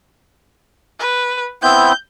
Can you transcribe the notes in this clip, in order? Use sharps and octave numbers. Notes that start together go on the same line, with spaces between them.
B4
B3 C4 E4 G6